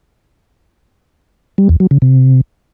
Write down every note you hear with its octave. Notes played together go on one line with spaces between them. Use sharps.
G3
E2
F#3
C#3
C3